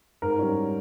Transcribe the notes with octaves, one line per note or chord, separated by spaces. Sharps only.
G#2 A#4
G3 C#4